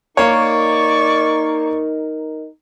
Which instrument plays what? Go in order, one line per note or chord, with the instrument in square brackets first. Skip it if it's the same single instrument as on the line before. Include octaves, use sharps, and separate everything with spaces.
[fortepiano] A#3 C#5 [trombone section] D#4 A#4 [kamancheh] D5 C#6